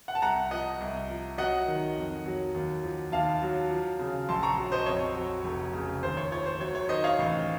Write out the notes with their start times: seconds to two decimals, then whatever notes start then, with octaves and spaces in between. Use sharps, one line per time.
0.08 F#5
0.15 A5
0.22 C2 F#5 A#5
0.51 F3 D#5 F#5
0.80 C2
1.10 F3
1.38 F#3 D#5 F#5
1.67 D#3
1.96 F2
2.26 F#3
2.54 D#2
2.84 F3
3.12 D#2 F5 A5
3.42 F#3
3.71 F3
3.99 C#3
4.29 A#1 A5 C6
4.43 A#5 C#6
4.57 F#3
4.72 C5 D#5
4.86 F2 C#5
5.15 F#3
5.44 F1
5.73 C#3
6.03 D#2 C5
6.17 C#5
6.31 F3 C#5
6.46 C5
6.60 F#3 C#5
6.75 C#5
6.89 D#3 C5 D#5
7.04 C#5 F5
7.18 A1